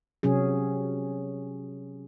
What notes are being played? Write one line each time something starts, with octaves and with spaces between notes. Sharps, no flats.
C3 F#3 C#4 G#4